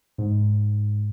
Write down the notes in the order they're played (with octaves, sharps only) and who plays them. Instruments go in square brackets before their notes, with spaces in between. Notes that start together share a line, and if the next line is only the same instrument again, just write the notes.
[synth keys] G#2